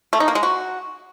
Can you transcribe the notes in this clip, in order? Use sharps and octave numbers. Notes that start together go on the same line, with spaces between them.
A3
D#4
A#3
G#3
F#4